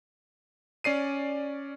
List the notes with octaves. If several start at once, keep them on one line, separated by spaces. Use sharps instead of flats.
C#4 D5 C7 D#7